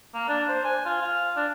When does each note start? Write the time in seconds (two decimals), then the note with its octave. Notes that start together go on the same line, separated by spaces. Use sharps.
0.14 A#3
0.28 D4
0.48 C5
0.65 G#5
0.85 F4
1.02 F5
1.36 D4